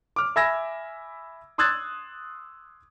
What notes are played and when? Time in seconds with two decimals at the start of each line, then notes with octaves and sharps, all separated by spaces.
0.16 D6 F6
0.36 E5 G#5 B5 E6 G#6 A#6
1.58 C6 D#6 E6 F#6 G#6 A6